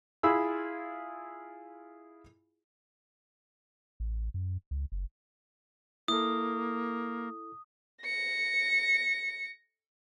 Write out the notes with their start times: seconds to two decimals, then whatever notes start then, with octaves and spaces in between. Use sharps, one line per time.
0.23 E4 F4 G#4 B5 E6
4.00 A1
4.34 F#2
4.71 C#2
4.92 F#1
6.08 A#3 E4 A4 D#6
8.03 A#6 C#7